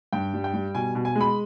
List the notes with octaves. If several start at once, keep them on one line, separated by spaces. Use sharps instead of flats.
G2 G5
G3
G5
G3
B2 G#5
B2
G#5
G#3
B5